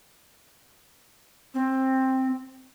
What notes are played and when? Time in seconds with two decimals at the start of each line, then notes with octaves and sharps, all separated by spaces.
1.54 C4